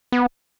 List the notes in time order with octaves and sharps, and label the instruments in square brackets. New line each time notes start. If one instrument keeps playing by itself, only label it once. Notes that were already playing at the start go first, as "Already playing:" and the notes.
[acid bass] B3